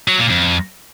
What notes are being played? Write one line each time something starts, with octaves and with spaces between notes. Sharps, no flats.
F#3
A#2
F2